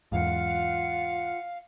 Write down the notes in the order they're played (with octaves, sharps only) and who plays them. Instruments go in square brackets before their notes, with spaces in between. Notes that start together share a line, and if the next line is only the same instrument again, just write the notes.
[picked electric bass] E2 G#2 [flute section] F4 F#5 [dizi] F5